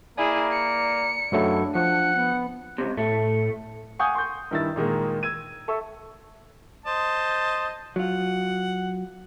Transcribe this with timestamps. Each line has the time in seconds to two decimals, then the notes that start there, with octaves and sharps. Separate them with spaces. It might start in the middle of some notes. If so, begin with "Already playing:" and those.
0.18 A#3 E4 G#4 D5
0.52 C#7
1.32 F#2 F#3 A3 D4 E4
1.75 F3 F#5 C#7
2.15 B3
2.78 C#2 G2 C3
2.97 A2 A3
3.99 F5 F#5 G#5 C#6 D#6 G6
4.15 C6 C#6 G6
4.51 G2 D#3 E4 E5 E6 A6
4.76 A#2 D#3 G#3 A#3
5.23 E6 G#6 D#7
5.68 A4 E5 C#6 E6
6.86 C5 D#5 A5
7.96 F#3 F4 F#5